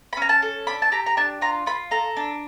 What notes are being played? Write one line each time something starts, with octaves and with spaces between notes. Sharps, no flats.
B5
C#4 A#5
A5
A4
D4 B5
A5
G4 A#5
A#5
D4 A5
F4 A#5
F4 B5
A4 A#5
D4